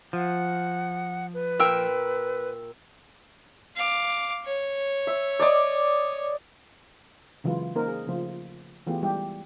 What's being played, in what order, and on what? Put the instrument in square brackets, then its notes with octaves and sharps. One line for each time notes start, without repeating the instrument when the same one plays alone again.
[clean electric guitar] F3 [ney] F#5
[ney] B4
[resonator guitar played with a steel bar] A#2 A#4 G5 [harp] E6
[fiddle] F5 D6
C#5
[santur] E5
D5 D#5 D6
[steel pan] C#3 E3 F#3 G#3 F4 B4
A#3 C#4 D#4 A#4 C5
G#4
C#3 F3 A3 F4 C5
E3 A3 B3 F4 G4 G#4
G3 G#3 E4 G4